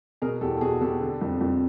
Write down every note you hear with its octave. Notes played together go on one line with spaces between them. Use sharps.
B2 G#4 A#4
E2 G4 A4
A4
B2 F#4 G#4
B2 G4 A4
D3
F2
F2